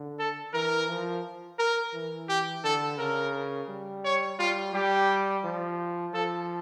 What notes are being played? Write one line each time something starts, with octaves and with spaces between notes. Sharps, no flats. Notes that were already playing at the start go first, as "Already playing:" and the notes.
Already playing: D3
A4
E3 A#4
F3
A#4
E3
G4
D3 A4
C#3 A#4
G3
C#5
G3 F4
G3 G4
F3
F3 A4